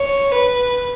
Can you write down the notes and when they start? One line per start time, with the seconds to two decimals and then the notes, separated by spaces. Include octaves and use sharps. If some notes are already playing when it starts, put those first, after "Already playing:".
Already playing: C#5
0.32 B4